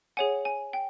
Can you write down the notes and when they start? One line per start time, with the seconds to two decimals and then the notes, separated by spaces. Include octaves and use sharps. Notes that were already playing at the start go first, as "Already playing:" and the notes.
0.17 G#4 C#5 F#5 G#5
0.45 G#5
0.73 G5